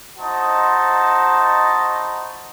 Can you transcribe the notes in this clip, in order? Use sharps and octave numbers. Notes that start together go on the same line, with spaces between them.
D#4 E4 F#4 C5 D#5 A5